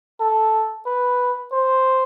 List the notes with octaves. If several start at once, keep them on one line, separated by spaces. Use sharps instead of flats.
A4
B4
C5